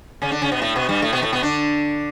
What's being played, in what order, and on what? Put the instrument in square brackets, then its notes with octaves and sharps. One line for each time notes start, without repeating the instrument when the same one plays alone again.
[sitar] C#3 C#4
D3 D4
C#3 C#4
B2 B3
A2 A3
B2 B3
G2 G3
A2 A3
B2 B3
A2 A3
B2 B3
D3 D4